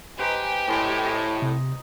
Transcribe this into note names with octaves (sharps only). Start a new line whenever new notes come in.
D#4 G4 B4 C5 G#5
A2 C5 D#5 C6
D#5
C3